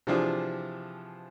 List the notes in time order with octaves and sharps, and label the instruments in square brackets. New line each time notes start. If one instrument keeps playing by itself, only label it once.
[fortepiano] C3 E3 F3 D4 F4 G#4